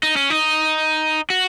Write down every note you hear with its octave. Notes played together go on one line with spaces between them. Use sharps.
D#4
C#4
D#4
F#4